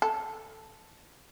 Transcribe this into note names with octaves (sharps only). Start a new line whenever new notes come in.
A4